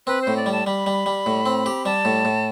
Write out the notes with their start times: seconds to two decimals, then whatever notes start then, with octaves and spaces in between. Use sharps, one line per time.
0.07 C4 B4
0.22 C5
0.27 A2
0.37 D5
0.46 G3
0.52 A5
0.66 G3 B5
0.86 G3
1.06 G3
1.26 A2
1.46 C4
1.66 G4
1.85 G3 A5
2.05 A2
2.25 A2